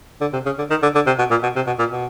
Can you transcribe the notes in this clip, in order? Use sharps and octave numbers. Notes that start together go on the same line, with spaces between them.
D3
C3
C#3
D3
D#3
D3
D3
C3
B2
A#2
B2
C3
B2
A#2
B2